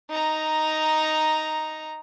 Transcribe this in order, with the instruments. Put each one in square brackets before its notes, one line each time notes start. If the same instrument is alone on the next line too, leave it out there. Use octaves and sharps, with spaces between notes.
[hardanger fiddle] D#4 A#5